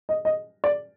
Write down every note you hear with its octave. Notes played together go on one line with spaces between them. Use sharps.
D#5
D#5
D5